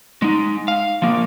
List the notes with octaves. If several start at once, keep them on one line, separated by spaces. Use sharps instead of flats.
G#3 D#4
F5
F3 A#3